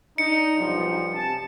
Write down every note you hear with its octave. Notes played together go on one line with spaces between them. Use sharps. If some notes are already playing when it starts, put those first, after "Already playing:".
D4 D#4 C#7
B1 G2 F3
C3 G#5 A5